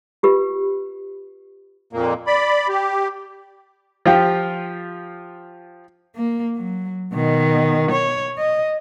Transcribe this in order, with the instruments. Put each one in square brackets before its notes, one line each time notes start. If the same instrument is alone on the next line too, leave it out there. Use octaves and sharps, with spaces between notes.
[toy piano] F4 G4 B4
[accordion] F2 A#2 A#3
D5 B5
G4
[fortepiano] F3 F4 G4
[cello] A#3
F#3
B2 D#3
C#5
D#5